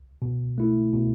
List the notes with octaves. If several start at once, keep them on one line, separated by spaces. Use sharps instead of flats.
B2
A3 E4
B2